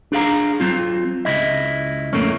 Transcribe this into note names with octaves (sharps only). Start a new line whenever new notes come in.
D4 G#4 F5 A#5
F#3 C4 F4
C#2 E4 D#5
F2 A2 A3 A#3 C#4